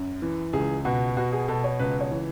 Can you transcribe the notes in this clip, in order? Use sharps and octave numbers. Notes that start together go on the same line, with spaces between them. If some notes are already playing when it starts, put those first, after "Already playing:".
Already playing: F#2
E3
C#2 G#4
B2 F#4
B2 F#4
G#4
B2 A4
C#5
C#2 B4
C#5
E3